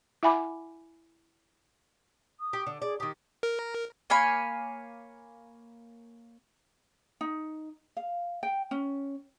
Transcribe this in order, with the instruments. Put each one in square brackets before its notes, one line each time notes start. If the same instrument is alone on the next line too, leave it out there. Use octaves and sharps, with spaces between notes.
[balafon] E4 E5 F#5 G#5 B5 D6
[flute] D#6
[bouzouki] G4
D3
[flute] G#4 [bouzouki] D5
[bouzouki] D#3 G4 [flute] D#6
[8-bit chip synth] A#4
[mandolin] A#3 C#5 G#5 B5
[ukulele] D#4
F5
G5
C#4